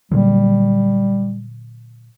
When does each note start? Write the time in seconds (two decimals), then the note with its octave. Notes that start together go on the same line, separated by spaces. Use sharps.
0.12 A#2 D3 F#3 G3